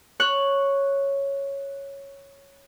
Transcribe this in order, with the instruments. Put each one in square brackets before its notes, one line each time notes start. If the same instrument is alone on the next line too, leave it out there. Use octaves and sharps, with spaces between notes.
[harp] C#5 F#6